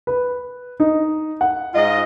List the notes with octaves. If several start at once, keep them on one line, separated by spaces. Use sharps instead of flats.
B4
D#4
F#5
G#2 F4 D#5